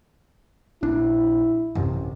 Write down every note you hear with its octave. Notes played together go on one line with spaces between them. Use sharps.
A#1 D4 E4
A1 F#2 C3